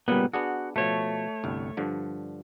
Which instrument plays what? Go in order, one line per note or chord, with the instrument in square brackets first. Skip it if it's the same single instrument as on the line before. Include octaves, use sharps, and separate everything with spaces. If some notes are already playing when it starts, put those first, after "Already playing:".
[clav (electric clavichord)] A#2 C#3 A#3 [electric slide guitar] G3 B3
[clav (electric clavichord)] B3 D4 G#4 [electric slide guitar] F#4
[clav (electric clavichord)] B2 F3 [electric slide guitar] A3 C#5
[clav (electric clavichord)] G1 C2
G2 D3 F3